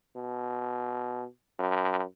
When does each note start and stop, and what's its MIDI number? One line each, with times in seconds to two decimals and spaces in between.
0.16 1.26 47
1.59 2.02 42